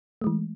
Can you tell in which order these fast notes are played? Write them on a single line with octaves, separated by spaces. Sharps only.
A3 G#3 E3